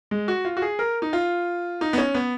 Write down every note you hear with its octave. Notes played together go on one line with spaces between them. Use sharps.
G#3
F#4
F4
F#4
G#4
A#4
D#4
F4
D#4
B3
C#4
B3